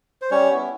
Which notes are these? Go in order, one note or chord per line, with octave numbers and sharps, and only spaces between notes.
C5
G3 C#4 C#5
B3 E4